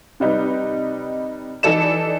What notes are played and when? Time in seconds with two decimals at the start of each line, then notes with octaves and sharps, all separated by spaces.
0.20 C3 G3 D#4 B4
1.63 E3 D#4 A4 D5 E7